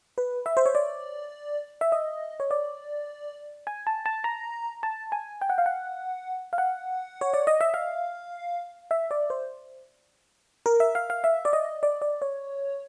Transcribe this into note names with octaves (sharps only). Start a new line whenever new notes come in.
B4
E5
C5
C#5
D5
E5
D#5
C#5
D5
G#5
A5
A5
A#5
A5
G#5
G5
F#5
F5
F#5
F5
F#5
C#5
D5
D#5
E5
F5
E5
D5
C5
A#4
E5
F5
F5
E5
D5
D#5
D5
D5
C#5